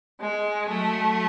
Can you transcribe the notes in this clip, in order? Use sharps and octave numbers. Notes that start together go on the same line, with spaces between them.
G#3
F#3 A3